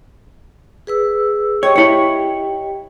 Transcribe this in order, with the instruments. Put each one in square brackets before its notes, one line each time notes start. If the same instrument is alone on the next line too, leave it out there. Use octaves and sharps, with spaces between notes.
[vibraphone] G#4 B4 E6
[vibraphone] G4 D#5 G5 [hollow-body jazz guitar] C#5
[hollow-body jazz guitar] E4 C#5